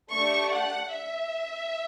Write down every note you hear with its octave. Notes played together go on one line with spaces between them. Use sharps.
A3 D4 G4 C#6
F#5
E5